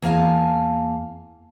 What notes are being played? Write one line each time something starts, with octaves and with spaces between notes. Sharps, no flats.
E2 A#3 A#4 F5 G#5 A5